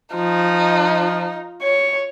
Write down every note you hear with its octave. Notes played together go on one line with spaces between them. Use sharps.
F3 D#4
C#5